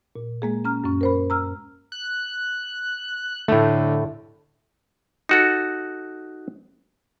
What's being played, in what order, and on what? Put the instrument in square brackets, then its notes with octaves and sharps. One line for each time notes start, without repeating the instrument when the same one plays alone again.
[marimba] A#2
G#3 A#3 G#4
C#4 A#5 F6
F#2 C#4
A#4 C5 B5
A#5 E6 F6
[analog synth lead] F#6
[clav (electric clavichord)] A2 A3 [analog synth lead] D3
[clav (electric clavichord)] D#4 F#4 A4